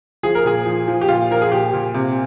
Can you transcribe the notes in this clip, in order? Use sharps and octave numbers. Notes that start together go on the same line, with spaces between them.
F3 G#4
A#4
A#2 G#4
F3
F3
G4
A#2 F4
F3 A#4
G#4
A#2 G4
A#2
C3